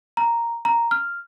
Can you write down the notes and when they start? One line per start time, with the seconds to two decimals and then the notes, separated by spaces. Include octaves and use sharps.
0.17 A#5
0.65 A#5
0.91 F6